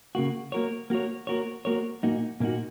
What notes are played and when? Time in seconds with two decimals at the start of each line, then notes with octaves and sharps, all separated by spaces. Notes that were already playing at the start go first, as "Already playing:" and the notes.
0.15 C#3 A#3 F#4
0.52 A#3 F#4 A#4 C#5
0.90 A#3 F#4 A#4 C#5
1.27 A#3 F#4 A#4 C#5
1.65 A#3 F#4 A#4 C#5
2.03 A#2 A#3 D#4 F#4
2.40 A#2 A#3 D#4 F#4